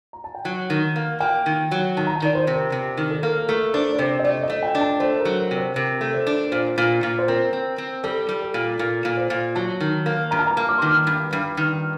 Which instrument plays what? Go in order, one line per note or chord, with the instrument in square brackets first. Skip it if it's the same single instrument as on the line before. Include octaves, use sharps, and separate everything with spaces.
[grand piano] A#5
A5
G5
[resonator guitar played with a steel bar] F#3 [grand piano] F#5
[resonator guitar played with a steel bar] D#3
A#3
[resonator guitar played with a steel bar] A#3 [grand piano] G5
[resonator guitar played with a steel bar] D#3
F#3
[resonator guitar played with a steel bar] D#3 [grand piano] A5
[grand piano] A#5
A5
[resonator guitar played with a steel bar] D#3 [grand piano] D5
[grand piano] C5
[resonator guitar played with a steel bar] C3
[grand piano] A#4
[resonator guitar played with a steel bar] C3
D#3
[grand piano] A4
[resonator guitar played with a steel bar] A#3
[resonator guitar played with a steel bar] A3 [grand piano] A#4
[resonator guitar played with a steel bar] D4 [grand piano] C5
[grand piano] D5
[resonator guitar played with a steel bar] C3 [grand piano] C5
[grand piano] D#5
[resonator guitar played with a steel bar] A3 [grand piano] D5
[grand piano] D#5
[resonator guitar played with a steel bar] A3
[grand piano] G5
[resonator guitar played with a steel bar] D4
[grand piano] A5
[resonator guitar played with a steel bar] A3 [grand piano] C5
[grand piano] A#4
[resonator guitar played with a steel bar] F#3
[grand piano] A#4
[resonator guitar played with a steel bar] C3
[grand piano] C5
[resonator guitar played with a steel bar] C3 [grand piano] A#4
[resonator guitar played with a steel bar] A3
[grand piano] C5
[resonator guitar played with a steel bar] D4
[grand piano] A#4
[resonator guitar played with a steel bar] A#2 [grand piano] C5
[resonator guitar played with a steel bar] A#2
A#2
[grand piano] C5
[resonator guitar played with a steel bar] C4 [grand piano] A#4
[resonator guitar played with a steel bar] C4
C4
[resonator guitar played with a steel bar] G3 [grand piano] A4
[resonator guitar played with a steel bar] G3
[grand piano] A4
[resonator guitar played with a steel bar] A#2
[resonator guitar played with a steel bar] A#2 [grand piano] A#4
[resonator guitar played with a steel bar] A#2
[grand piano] C5
[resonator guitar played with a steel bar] A#2
[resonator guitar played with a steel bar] F#3 [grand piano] A5
[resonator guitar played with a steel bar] D#3
A#3
[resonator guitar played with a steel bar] G2 [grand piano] A#5
[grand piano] A5
A#5
[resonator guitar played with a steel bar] A#3
[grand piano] D6
C6
[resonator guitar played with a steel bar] D#3 [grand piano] D6
[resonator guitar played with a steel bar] G2
G2
D#3